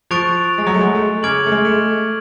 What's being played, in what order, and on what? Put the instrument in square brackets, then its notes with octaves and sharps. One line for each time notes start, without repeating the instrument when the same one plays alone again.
[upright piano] F3 [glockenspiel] C#6 F#6 A6 D7 F7
[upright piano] G#3
F#3
A3
G#3
A3
[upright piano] C#3 [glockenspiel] D6 F6 G#6 D7 F#7
[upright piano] A3
G#3
A3